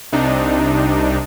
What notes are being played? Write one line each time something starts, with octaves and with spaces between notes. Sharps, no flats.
C2 C3 D4 D#4